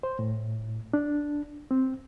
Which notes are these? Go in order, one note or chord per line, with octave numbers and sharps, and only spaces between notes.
C5
A2
D4
C4